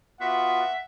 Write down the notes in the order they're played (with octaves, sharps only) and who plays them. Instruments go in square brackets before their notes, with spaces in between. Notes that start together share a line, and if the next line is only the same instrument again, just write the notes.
[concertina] B3 F4 F#4 [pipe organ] E5 [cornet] F#5